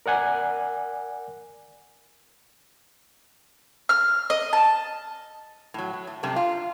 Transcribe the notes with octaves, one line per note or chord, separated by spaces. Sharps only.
A#4 D5 F#5 G#5
F6
D#5
A5
A2 F#3
F#3
A2
F#2 C3 G3 A3 D4
F4